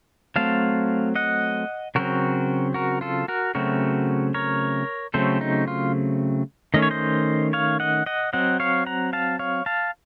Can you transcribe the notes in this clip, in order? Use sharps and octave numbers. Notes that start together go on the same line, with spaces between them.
F#3 A3 C4 F5 A5
D#5 F#5
C#3 F#3 C4 F#4 A#4
F#4 A#4
F4 A4
F#4 A#4
C#3 F#3 A3 C4 F#4 A#4
A#4 C#5
C#3 F#3 A3 C4 A4 C5
D#4
F4
D#3 A3 C#4 D#5
C#5
C5 D#5
C#5 F5
D#5 F#5
D#5 F#5
F#3 C4 D#5 F#5
C#5 F5
F#5 A#5
F5 A5
C#5 F5
F5 A5